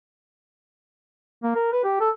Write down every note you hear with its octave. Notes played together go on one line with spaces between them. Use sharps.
A#3
A#4
B4
G4
A4